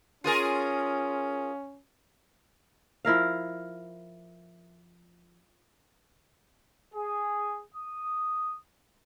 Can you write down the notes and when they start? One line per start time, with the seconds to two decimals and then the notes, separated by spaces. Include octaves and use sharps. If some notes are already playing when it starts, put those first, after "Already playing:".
0.24 C#4 F4 G#4 A#4
3.05 F3 E4 A#4 F5
6.93 G#4
7.73 D#6